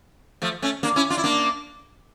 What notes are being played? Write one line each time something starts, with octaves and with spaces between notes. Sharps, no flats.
F3 A3
A3 C#4
A#3 D4
C#4 E4
D4 F4
E4
A#3 D4